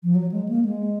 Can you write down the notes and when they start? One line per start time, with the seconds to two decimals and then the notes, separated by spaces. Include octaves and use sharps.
0.03 F3
0.15 F#3
0.32 G#3
0.49 A#3
0.65 G#3